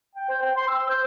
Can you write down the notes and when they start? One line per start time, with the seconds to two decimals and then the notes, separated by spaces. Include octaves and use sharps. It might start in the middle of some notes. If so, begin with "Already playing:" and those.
0.15 G5
0.29 C5
0.42 G5
0.56 C6
0.68 E6
0.89 C5